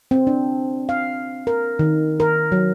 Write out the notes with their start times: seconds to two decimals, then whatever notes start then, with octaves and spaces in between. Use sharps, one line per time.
0.11 C4
0.27 D4
0.89 F5
1.47 A#4
1.79 D#3
2.20 A#4
2.52 F#3